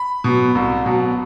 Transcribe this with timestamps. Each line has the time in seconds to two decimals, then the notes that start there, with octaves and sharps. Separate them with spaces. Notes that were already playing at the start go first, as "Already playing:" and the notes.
Already playing: B5
0.24 B2 F#3
0.55 C2
0.85 B2 F#3